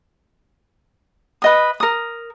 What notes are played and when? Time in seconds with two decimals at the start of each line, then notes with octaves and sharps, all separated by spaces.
1.42 B4 D#5 D#6
1.80 A#4 D#6